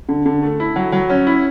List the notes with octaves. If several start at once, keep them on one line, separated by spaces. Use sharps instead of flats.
D3
D3
A3
E4
F#3
F#3
C#4
E4